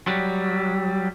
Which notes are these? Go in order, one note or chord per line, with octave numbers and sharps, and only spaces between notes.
F#3 G3